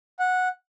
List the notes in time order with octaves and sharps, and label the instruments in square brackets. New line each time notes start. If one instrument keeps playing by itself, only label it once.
[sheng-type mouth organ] F#5